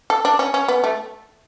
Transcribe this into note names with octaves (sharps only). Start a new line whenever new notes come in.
A4
D4
C#4
C#4
B3
A3